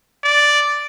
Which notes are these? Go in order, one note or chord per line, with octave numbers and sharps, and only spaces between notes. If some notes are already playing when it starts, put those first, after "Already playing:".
D5